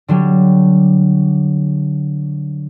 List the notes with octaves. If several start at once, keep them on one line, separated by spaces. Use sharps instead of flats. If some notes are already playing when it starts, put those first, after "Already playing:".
D3 F#3 G3